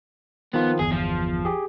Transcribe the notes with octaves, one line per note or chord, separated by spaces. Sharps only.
D#3 F3 B3 F4
G1 E2 G#4
F3
G4 G#4